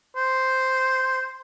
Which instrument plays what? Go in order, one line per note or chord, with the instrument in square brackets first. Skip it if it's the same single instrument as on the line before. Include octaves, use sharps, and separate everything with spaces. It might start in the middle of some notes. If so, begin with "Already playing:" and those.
[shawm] C5